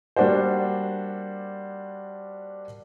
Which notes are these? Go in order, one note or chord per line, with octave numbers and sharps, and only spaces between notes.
G3 A#3 D4 F#4 C5